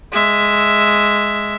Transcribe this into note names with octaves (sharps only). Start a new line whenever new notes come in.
G#3 E5